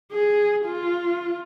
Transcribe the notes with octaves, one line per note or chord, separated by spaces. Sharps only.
G#4
F4